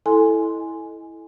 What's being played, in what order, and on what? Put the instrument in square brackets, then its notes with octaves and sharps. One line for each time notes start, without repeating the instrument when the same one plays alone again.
[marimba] E4 A4 D#5 G#5 C6